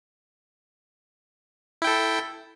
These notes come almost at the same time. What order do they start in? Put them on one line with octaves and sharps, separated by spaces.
E4 G5 A4